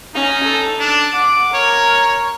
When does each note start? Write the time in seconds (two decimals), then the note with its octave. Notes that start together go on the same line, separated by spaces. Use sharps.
0.15 C#4 D#4
0.45 A4
0.80 D4
1.14 F#5 D6
1.54 A#4 C#5